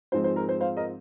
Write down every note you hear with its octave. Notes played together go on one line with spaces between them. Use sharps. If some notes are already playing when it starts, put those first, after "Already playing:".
G#2 F3 G#3 C4 C5
C5
A#4
C5
C5 F5
A#4 D#5